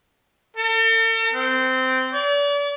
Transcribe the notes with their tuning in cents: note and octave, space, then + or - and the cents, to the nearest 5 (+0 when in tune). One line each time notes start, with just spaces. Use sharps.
A4 +45
C4 -15
D5 -40